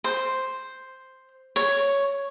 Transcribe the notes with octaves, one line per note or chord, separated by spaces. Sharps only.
C5
C#5